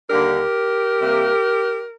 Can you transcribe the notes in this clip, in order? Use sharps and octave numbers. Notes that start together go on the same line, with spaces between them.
D#2 D3 G3 A#3 D4 G4 A#4
C3 G3 A#3